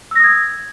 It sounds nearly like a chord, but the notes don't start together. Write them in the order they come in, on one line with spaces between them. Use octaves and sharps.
E6 A#6 D#6 G#6